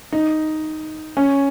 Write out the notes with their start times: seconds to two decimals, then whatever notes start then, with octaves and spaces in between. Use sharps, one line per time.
0.12 D#4
1.17 C#4